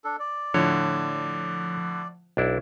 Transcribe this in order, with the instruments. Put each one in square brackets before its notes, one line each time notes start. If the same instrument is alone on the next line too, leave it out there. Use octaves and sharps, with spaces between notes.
[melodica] D4 A4
D5
[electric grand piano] A2 D3 [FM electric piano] F3 [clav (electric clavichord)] C#5
[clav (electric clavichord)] B1 D4 E4